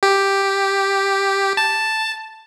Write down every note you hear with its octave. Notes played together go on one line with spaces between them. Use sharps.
G4
A5